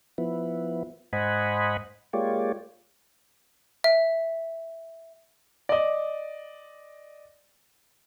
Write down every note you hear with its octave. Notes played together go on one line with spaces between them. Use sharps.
F3 B3 E4
G#2 C5 D#5 F#5 G#5 B5
G#3 A#3 F4 G4 C#5 D5
E5
D5 D#5